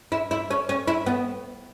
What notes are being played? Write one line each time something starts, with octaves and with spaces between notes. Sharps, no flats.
E4
E4
C#4
C#4
E4
B3